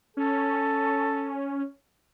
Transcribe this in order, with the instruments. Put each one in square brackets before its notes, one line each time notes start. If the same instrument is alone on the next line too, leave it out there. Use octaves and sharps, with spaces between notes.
[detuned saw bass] C#4 [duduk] A4